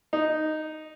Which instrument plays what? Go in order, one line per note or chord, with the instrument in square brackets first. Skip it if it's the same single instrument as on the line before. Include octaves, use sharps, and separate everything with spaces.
[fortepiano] D#4